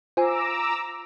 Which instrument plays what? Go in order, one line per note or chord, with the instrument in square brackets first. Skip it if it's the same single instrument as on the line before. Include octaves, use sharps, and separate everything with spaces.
[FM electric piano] F4 [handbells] C5 G#5 [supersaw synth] A#5 D6 E6